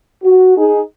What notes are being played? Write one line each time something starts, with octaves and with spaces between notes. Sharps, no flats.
F#4
D#4 G#4